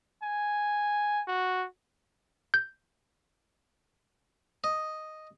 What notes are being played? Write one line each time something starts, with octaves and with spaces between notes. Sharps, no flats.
G#5
F#4
G6
D#5